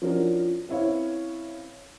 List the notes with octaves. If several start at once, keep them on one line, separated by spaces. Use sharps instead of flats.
F3 C#4 D4 E4 F#4 A#4
C4 C#4 E4 B4 C#5 F5